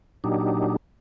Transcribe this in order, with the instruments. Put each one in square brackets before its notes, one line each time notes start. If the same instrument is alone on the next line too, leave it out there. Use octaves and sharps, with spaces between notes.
[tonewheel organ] A#2 F#3 D4 D#4 G4